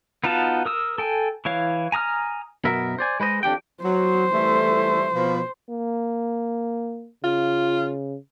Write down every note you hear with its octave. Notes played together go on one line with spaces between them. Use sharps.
B3 D#4 F4 F#4 A5
A#4 D#6 E6
A4 G5 G#5
E3 E4 C#5 F5
G#5 A#5 D#6 F6
F#2 B2 B3 A#4 E5
C5 D5 G#5
G#3 B4 C5 D#5
F2 D4 G4 G5
F#3 C5
E3 G3 A3
B2 F3
A#3
C#3 F4